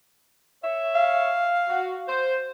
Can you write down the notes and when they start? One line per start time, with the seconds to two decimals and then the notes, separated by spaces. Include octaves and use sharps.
0.64 C#5 E5
0.95 F5
1.69 F#4
2.08 C5